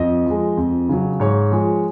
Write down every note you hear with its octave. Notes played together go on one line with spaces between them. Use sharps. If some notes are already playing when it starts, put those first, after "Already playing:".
Already playing: F2 D#5
F3 G#3
F2
C#3 F#3
G#2 C#5
F3 G#3